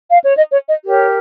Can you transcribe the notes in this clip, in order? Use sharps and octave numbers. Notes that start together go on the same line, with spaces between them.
F5
C#5
D#5
C#5
D#5
G4 A#4 C#5